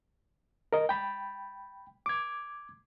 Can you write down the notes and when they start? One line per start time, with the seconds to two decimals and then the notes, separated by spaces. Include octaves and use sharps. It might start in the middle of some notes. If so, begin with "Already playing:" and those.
0.73 A#4 D#5
0.89 G5 B5
2.06 D6 G#6